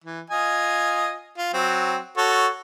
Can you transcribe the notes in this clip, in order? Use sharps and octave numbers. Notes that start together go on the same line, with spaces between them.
E3
F4 D#5 G#5
F4
F#3 C4
F#4 A4 C#5